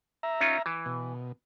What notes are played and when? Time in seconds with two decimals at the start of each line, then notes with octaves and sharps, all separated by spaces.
0.23 E5 A#5
0.41 C#4 D#4 F4
0.66 E3
0.86 B2